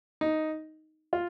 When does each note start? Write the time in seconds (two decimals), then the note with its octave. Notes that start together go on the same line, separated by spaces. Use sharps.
0.21 D#4
1.13 F4